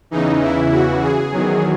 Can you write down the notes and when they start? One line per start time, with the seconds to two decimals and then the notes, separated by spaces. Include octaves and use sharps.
0.11 E2 C#3 E3 D#4
0.41 E4
0.71 F#4
1.01 G#4
1.31 E2 D#3 F#3